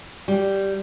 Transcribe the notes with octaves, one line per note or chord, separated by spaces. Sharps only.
G3